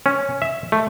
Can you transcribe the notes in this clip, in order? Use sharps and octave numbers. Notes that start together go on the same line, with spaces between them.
C#4
E5
A3